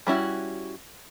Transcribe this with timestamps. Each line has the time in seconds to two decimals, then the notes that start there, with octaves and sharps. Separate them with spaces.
0.07 G3 C#4 E4 F#4